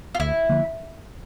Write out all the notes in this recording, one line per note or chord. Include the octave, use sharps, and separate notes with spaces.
F4
D2 E4
D3 F3 A#3